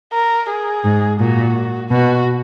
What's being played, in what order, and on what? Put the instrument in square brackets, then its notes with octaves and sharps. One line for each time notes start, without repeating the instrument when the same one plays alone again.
[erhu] A#4
G#4
[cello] G#2
[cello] A#2 [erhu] F#4
[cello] B2 [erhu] F#4